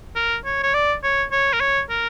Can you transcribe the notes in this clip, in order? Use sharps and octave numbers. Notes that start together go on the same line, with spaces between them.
A#4
C#5
C#5
D5
C#5
C#5
A#4
C#5
A#4